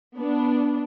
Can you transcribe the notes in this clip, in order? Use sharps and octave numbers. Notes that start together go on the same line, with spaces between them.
B3 D4